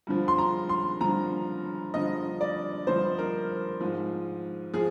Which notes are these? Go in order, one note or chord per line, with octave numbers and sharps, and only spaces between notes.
G2 D3 F3
C6
A#5
C6
G2 D3 F3 A#5
G2 D3 F3 D#5
D5
G2 D3 F3 C5
A#4
G#2 F3
F3 G#4